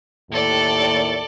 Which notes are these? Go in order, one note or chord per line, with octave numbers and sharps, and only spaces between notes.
D#2 A2 A4 D5